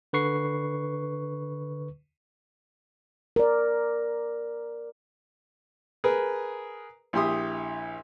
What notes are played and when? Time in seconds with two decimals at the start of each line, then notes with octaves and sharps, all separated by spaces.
0.13 D3 B4 C#6 C7
3.36 A#4 D5
6.04 G#4 A#4 B4
7.13 A#1 E4 G4 C6 D#6